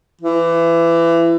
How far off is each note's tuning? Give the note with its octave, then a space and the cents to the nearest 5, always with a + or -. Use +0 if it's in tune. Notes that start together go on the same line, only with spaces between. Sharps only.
E3 +25